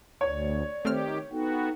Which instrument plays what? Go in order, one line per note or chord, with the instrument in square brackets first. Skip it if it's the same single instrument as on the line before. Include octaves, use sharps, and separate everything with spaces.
[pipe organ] D2 [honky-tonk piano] C#5 [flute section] D5
[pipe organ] D#3 G4 [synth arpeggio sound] A3 C4 F6
[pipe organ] B3 F#4 [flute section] D#4 A4 G5